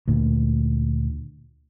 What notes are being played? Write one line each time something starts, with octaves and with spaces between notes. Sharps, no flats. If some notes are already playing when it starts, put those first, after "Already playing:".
D2 A#2